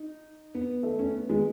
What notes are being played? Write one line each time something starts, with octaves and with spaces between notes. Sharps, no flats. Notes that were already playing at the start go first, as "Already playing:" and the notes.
Already playing: D#4
B3
A3
C#4
B3
G#3